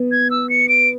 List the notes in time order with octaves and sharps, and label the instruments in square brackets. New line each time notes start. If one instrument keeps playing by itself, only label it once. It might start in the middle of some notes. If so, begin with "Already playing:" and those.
Already playing: [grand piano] B3
[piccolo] G#6
E6
C#7
D7